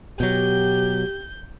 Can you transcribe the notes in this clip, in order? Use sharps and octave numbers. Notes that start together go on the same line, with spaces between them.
B2 F#3 G4 G6